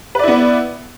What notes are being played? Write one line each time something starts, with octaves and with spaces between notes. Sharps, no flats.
B3 E4 B4 D5